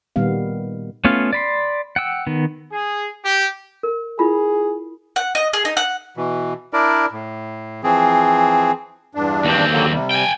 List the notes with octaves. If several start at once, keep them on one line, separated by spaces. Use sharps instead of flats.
A#2 D#3 G3 B3 F5
A3 B3 C#4 F4 F5
D5 B5 C6
F#5 G5 E6
D#3 B3
G#4
G4
A#4
E4 F4 G#4 B5
F#5
D#5
G#4
D#4
F#5
B2 E3
D4 E4 A#4 D5
A2
E3 F3 C4 G#4
E2 G2 D4
D#2 C4
D3 F#3 A#3
C3 G3
G5 G#5